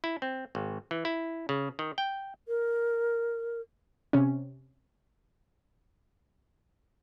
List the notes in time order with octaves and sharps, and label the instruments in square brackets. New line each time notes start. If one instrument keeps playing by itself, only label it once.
[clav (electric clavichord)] E4
C4
G#1
E3
E4
C#3
D#3
G5
[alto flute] A#4
[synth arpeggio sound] C3 C#4